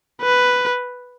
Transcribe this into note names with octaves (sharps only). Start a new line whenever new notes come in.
B4